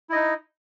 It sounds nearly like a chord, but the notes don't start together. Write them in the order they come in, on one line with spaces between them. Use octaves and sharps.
E4 D#5 D#4